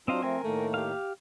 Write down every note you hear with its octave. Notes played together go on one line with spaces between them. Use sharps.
F#3 C4 D4 F4 C5 D#5 F5
F3 A3 C4 A#4 G#5
A2 D#3 A3 A#3
G4 F5